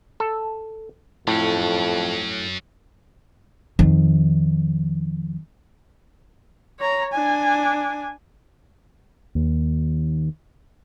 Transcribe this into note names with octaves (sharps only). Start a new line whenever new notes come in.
A4
F2 A2 F#3 C#4
F2 D#3
C#5 A#5
D4 G#5
D#2